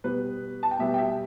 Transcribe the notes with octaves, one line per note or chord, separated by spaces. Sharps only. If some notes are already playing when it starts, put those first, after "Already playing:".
B2 G3 B3 B4
A5
G5
B2 G3 B3 E5
G5
E5